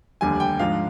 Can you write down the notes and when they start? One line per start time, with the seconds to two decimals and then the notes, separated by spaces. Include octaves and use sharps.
0.21 F1 D#2 D3 G3 D4 G#5
0.40 G5
0.59 G#2 F3 G#3 D4 F5